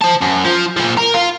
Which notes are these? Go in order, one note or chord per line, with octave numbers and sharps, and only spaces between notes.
C5 A5
F#2
F3
A#2 F3
A#4
F4